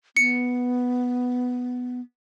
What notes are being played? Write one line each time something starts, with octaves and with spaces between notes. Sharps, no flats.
B3 C#7